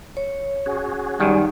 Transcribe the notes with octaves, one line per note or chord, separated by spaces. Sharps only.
C#5
C#4 F#4 G#4
F#2 D#3 G3 D#4